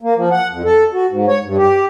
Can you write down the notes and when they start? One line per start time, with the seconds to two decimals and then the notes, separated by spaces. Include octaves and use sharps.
0.01 A#3
0.17 F3
0.32 F#5
0.50 F2
0.65 A4
0.93 F#4
1.10 G#2
1.28 C#5
1.44 G2
1.58 G4